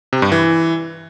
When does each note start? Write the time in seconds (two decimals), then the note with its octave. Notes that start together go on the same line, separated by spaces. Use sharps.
0.13 C3
0.22 G2
0.32 E3